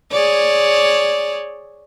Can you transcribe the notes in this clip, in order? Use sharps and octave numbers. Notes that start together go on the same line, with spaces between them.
G#4 C#5 D5